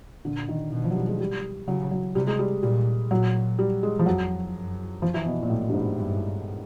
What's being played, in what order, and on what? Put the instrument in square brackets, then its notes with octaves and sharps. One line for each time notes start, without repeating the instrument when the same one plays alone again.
[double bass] A#2 [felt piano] D3
[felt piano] D#3
[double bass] B2 [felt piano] D#3
[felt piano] F3
F#3
G3
G#3
G3
[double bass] C#3 [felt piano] F#3
[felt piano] F#3
[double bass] C3 [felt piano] G3
[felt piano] G#3
G3
[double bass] A#2 [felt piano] G3
[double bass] A#2 [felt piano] F#3
[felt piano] G3
G#3
F3
[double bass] F2 [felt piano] F#3
[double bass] F#2
[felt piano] F3
E3
B2
A#2
A2
G2
G#2
[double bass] G2